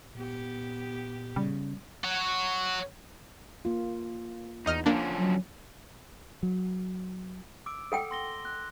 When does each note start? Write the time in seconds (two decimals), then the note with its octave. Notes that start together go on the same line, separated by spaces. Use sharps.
0.15 A#2 B3 G4
1.36 C#3 G3
2.04 F#4 C#5
3.65 A#3 F4
4.66 E2 D#4 D#5 F6
4.86 D3 F3 A#3 C#4 D4
5.17 F#3
6.43 F#3
7.66 D6 E6 D7
7.92 A4 F#5 G5
8.11 C6 A#6 G7
8.45 F#6